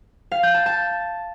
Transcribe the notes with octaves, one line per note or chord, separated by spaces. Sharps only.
F5
G6
A5
A5